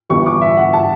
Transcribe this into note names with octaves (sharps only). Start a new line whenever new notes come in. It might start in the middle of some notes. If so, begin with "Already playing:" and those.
G1 G2 E3 G3 C#6
D6
E5
F#5
A5